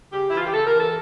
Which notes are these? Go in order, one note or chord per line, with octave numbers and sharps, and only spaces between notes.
C#3 G4
E3 E4
F4
G4
C#3 A4
A#4
E3
A4